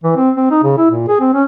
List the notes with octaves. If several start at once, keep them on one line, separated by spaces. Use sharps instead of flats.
E3
C4
C4
D#4
C#3
E4
A#2
G#4
C4
C#4